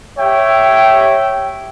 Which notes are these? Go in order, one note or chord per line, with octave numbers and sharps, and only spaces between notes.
G4 C#5 E5 G5